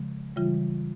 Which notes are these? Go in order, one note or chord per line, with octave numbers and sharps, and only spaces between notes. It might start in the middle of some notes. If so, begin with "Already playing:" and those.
Already playing: C#3 F3 G#3
C#3 E3 G3 F4